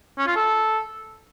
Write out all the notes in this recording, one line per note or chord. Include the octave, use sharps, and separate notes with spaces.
C#4
F4
A4